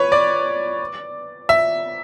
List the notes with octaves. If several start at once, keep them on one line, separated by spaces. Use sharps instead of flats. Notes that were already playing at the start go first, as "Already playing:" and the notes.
Already playing: B4 C#5
D5
E5